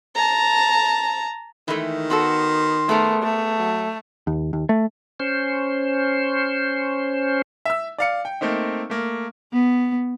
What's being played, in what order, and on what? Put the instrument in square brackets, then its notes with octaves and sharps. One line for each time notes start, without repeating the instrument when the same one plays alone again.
[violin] A5 A#5
[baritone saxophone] D#3 [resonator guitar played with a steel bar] E3 G#3 A3
[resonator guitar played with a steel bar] B3 F#4 A4 [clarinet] C6
[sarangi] A3 [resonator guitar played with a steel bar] B3 G#4 A#4
[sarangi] A3
[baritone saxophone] F#3
[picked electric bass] D#2
D#2
A3
[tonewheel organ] C#4 C5
[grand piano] E5 E6
D5 F5 C#7
G5
A3 A#3 C4 D#4
A3 A#3
[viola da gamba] B3